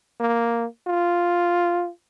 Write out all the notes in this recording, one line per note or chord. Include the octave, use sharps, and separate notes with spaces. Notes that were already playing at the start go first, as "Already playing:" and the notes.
A#3
F4